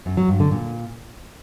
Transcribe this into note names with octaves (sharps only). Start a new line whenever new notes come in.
F#2
F#3
G2
D3
A#2